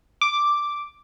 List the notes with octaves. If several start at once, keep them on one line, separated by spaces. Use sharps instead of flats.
D6